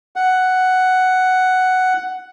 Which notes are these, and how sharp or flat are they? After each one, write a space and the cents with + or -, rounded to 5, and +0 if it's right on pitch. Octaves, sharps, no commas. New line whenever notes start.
F#5 +5